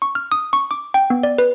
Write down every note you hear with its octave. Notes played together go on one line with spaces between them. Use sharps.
C#6
F6
D#6
C#6
D6
G5
B3
D5
B4